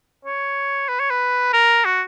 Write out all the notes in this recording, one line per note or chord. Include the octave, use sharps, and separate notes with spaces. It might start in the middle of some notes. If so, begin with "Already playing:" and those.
C#5
B4
C#5
B4
A#4
F#4